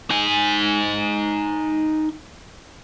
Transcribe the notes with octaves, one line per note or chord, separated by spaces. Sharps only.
D#4 G#5